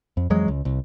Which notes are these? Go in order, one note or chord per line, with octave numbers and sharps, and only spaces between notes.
F2
F2 E3 F#3 G#3
C#2
C2